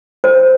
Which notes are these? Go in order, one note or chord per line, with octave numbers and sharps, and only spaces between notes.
C5